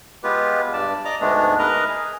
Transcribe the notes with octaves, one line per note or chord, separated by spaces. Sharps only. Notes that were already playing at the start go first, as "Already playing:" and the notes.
G#3 B3 F4 G4 B4
G2 D5 A5
D5 D#5 A#5 D6
D2 G#2 G#3 A3 B3 D4
A#4 B4 D#5 A#5
G#4